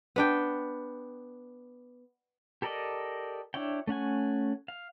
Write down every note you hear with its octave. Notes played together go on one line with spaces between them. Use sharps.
B3 D4 G5
G4 A4 A#4 D5 D#5
D4 E4 C#5 G5
A3 C#4 F#5 G#5
F5